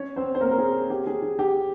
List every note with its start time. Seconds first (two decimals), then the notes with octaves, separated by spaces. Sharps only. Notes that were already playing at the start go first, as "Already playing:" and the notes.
Already playing: C#4 C#5
0.16 C4 C5
0.35 C5
0.41 A#3 A#4
0.51 A#4
0.58 G#4
0.90 G4
1.07 G#4
1.22 G#4
1.39 G4